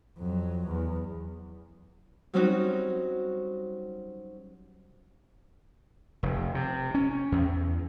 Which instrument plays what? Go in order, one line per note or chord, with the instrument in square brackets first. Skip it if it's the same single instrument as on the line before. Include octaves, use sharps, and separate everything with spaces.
[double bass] F2 F#3
E2
[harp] F#3 G3 C4 C#4 D#4 F#4
[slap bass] F1
C3
C#4
E2